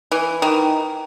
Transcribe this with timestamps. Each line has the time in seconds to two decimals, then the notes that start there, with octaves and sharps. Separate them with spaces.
0.12 E3
0.42 D#3